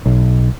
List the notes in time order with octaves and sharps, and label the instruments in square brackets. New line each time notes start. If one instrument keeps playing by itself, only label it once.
[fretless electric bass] B1